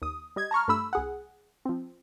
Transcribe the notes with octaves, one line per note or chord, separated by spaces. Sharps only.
D#2 D#6
G3 D#5 G#6
A5 A#5 C#6 F6
G2 A3 B5 E6
C2 G#4 F#5
F3 C4